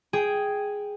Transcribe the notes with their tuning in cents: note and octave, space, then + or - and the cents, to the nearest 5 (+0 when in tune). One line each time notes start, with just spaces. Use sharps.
G#4 +0 G5 +0